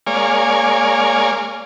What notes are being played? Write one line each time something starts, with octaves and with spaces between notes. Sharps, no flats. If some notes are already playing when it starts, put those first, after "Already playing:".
G#3 A#3 C#5 D5 F5 G#5